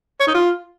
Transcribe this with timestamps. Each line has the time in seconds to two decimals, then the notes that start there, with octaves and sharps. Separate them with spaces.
0.20 C#5
0.27 D#4
0.34 F4